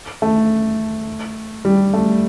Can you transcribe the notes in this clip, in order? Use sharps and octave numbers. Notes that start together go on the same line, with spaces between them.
A3
G3
A3